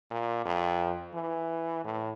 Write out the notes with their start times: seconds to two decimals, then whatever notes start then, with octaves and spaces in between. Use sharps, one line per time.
0.11 A#2
0.45 F2
1.14 E3
1.84 A2